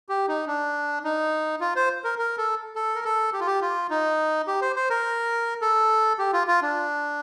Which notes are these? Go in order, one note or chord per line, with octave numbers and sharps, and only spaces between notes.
G4
D#4
D4
D#4
F4
C5
A#4
A#4
A4
A4
A#4
A4
G4
F4
G4
F4
D#4
G4
C5
C5
A#4
A4
G4
F4
F4
D4